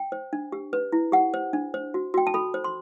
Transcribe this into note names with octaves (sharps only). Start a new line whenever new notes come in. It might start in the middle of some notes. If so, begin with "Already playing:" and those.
Already playing: G5
C5
D4
G4
B4
E4
G4 F#5
C5
D4
C5
F#4
F#4 G5
A5
A4 B5
C5
C6